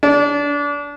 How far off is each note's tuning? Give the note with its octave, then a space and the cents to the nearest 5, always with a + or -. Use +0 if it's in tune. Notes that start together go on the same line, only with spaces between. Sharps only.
D4 -25